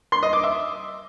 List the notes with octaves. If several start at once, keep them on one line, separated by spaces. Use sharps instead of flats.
C6
D#5
D6
E5